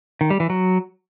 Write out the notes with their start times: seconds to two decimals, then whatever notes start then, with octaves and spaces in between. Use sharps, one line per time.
0.21 D#3
0.30 G3
0.40 E3
0.50 F#3